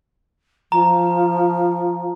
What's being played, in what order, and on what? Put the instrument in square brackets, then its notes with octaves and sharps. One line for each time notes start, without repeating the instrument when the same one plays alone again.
[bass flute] F3 [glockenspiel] A#5